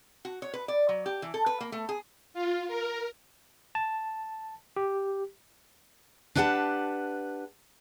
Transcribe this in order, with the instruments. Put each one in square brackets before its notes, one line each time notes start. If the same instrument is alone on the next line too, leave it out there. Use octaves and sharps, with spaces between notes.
[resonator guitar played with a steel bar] F#4
C#5
B4
D5
F#3
G4
E3
A4
B4
A#3
A3
G#4
[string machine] F4
A#4
[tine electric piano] A5
G4
[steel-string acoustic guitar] D4 G4 B4 F#5 G5 A5